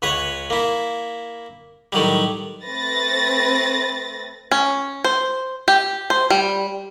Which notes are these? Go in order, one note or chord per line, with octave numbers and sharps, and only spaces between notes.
C#2 B4 C#5 F#5
A#3 E4
A2 D#3 F#3 G3
A3 C4 B4 A6 A#6
C#4
C5
G4
C5
G3